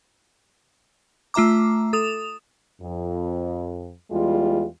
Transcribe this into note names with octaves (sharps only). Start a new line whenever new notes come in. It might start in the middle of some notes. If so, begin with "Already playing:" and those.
A3 F4 E5 A#5 D6
A4 D#6 E7 F7
F2
E2 G3 G#3 F4